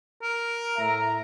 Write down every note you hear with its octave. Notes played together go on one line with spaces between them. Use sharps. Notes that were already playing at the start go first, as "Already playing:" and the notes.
A#4
A2 E5 A#5